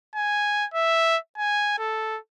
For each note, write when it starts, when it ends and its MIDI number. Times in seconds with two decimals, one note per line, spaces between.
0.16 0.66 80
0.74 1.17 76
1.38 1.75 80
1.79 2.19 69